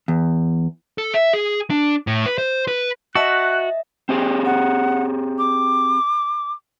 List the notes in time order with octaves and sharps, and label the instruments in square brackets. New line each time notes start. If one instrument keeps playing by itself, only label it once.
[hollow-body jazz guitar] E2
[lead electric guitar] A4
E5
G#4
D4
A2
B4
C5
B4
[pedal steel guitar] F#4 [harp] D#5 E5 A5 [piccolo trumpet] F#6
[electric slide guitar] C4 G4 G#4
[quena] F#5
D6